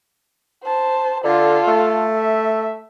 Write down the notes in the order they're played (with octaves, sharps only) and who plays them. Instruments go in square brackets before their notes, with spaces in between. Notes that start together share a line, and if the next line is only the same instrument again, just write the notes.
[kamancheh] C5 A5
[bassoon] D3 [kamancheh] F4 A4
[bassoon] A3
[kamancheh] E5